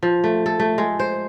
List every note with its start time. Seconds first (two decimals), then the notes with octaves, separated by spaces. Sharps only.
0.03 F3
0.24 A3
0.46 A4
0.60 A3
0.78 G#3
1.00 C5